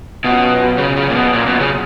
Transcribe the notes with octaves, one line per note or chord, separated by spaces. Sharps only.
B2 F#3 C#4 F4
C#3
C#3
A#2
B2
A#2
B2
C#3